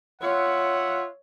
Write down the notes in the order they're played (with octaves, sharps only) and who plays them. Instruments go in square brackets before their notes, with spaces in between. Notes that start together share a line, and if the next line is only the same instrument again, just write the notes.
[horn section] F4 E5 F#5 [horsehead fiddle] C#5